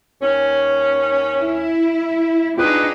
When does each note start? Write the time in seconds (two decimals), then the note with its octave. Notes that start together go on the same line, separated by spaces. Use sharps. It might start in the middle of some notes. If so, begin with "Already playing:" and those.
0.22 D#2 C#4
1.38 E4
2.57 D4 D#4 F4 G4 G#4 B4